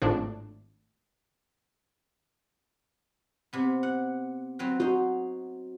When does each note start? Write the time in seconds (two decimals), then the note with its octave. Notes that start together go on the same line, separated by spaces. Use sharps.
0.02 G#1 A2 F3 D4
3.53 C3 B3
3.83 F#5
4.59 F#3 C4 B4
4.80 D#4 F#4 C5